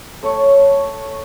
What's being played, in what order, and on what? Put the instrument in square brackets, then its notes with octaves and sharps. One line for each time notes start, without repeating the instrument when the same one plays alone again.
[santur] A3 C#5